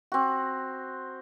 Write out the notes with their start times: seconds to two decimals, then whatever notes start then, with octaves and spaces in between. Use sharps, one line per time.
0.12 C4 F#4